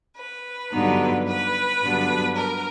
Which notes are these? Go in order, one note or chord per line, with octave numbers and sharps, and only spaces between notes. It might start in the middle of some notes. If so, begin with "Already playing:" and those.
B4
G2 D3 F#3 B3 D#4
B4
G2 D3 F#3 B3 D4
A#4